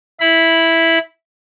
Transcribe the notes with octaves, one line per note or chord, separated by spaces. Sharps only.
E4 B5